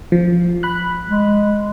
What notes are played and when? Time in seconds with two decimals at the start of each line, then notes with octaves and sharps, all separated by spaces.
0.12 F3
0.63 B5 F#6
1.09 G#3